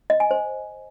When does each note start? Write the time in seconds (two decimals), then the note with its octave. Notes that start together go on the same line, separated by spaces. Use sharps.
0.10 D#5
0.20 G#5
0.31 C5